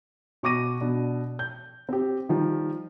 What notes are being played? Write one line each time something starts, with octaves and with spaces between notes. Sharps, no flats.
B2 C#6 D6 A#6 D#7
B2 D4
G6
C4 G4
D#3 F3 G3